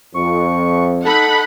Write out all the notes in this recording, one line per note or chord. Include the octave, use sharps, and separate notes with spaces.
F2 C#6
D#4 A4 F#5 B5